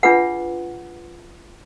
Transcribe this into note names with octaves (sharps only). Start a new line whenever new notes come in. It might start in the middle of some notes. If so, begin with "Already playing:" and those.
D4 F4 G#4 B4 F#5